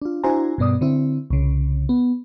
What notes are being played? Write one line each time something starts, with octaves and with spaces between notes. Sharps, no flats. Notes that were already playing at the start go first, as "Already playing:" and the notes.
D4 F4
D4 E4 F#4 C5 G#5 A#5
G2 B2 B3 D5 D#6
D3 C4 E4
C2 C#3
B3